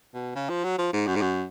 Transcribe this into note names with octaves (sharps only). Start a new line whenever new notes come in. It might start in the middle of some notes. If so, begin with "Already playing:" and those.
B2
C#3
F3
F#3
F3
G#2
F#2
G#2
F#2